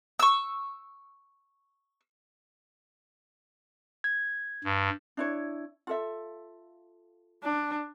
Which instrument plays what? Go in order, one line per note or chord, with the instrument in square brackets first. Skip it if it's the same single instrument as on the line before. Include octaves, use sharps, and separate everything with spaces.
[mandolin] C#6 E6
[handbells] G#6
[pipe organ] G2
[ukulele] D4 E4 C#5
F4 A4 E5
[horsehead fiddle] D4